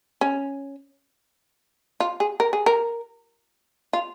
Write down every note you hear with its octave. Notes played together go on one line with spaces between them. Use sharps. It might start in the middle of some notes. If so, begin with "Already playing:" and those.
C#4
F4
G#4
A#4
G#4
A#4
F4